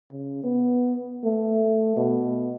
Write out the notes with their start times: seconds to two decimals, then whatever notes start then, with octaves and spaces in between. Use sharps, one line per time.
0.11 C#3
0.43 B3
1.24 A3
1.96 B2